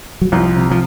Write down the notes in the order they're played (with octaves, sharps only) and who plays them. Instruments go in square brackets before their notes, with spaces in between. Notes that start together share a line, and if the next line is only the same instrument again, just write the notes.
[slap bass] F#3
[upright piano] C2 [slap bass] F3
[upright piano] C3
[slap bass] F3